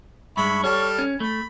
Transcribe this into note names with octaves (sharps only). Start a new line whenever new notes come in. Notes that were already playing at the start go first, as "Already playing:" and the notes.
G2 G#3 E5 B5 C#6
G3 A4 C#5 F6
C#4
A3 B5